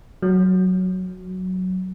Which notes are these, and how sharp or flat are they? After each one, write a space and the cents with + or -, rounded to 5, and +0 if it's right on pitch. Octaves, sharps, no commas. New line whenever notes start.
F#3 +0